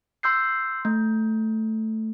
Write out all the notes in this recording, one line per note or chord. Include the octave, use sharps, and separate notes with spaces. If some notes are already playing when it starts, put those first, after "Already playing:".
C6 E6 G6 C7
A3